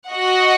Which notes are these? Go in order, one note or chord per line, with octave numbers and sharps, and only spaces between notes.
F#4 D#5 F#5